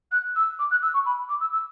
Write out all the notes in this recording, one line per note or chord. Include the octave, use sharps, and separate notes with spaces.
F#6
E6
D6
F#6
E6
C#6
B5
D6
E6
E6